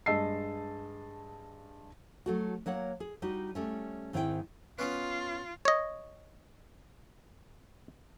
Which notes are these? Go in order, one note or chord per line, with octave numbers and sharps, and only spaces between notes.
G2 G#3 D#5 A5 E6 C7
F#3 A3 F#4
F#3 A#3 C#5 F#5
G#4
G3 D#4 F#4
G3 A3 C#4
G#2 D#3 C4 E4 A#4 G5
B3 C#4 F4 B4
C#5 D#5